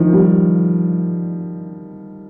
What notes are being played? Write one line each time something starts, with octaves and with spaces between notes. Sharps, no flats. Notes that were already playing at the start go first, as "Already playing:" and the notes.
Already playing: D#3 F3
G3